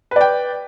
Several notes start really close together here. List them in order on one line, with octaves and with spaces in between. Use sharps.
B4 D5 G5